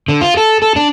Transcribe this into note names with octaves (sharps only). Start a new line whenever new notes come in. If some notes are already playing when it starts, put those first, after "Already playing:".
D3
F4
A4
A4
D4